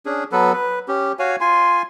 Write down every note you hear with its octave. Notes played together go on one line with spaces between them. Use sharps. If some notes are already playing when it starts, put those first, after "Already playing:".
C#4 D4 G#4
F#3 B3 A4 B4
B4
C#4 G4
F#4 C#5 F5 G#5
F4 G#5 C6